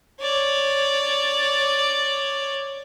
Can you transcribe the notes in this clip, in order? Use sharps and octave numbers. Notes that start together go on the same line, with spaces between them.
C#5 D5